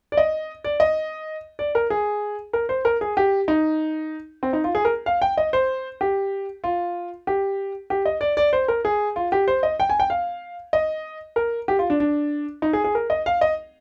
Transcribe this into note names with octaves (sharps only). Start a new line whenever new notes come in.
D5
D#5
D5
D#5
D5
A#4
G#4
A#4
C5
A#4
G#4
G4
D#4
C4
D#4
F4
G#4
A#4
F5
G5
D#5
C5
G4
F4
G4
G4
D#5
D5
D5
C5
A#4
G#4
F4
G4
C5
D#5
G5
G#5
G5
F5
D#5
A#4
G4
F4
D4
D4
D#4
G#4
G#4
A#4
D#5
F5
D#5